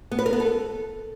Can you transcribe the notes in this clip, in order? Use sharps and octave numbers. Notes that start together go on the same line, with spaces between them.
B3
B4
A#4
B3
A4